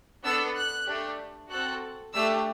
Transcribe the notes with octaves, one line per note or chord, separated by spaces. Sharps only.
B3 D4 A4 E6
F#6
A3 D4 G4
C4 F#4 A4 F#6
A3 D4 G4 E6